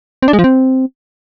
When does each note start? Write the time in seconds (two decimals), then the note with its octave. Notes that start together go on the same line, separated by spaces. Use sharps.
0.22 C4
0.28 D4
0.33 G#3
0.39 F3
0.44 C4